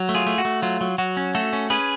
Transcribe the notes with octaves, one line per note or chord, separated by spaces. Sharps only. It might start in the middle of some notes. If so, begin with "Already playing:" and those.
Already playing: F#3
A3
F4 G#4
A3
F#4
A3
F#3 F4
F#3
F#3 F#4
C#4
A3 F#4 A4
C#4
C#4 G#4 B4